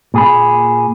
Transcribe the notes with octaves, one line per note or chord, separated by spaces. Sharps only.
A#2 G#4 B5